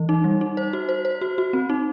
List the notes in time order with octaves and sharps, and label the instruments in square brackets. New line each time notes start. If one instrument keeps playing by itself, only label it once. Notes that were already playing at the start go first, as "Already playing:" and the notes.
Already playing: [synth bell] E3
D#4
G3
D#4
C5
F#4
C5
C5
F#4
F#4
C4
D#4